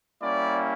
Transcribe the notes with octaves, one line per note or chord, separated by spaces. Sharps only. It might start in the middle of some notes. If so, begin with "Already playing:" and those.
G3 A#3 C#4 E4 D5